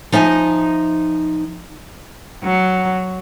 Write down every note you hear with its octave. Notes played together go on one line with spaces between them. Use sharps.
F3 D#4 E5 G#5
F#3